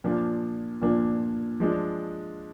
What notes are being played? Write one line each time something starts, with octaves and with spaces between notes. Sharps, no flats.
A#2 F3 A#3 D4
A#2 F3 A#3 D4
F3 G#3 D4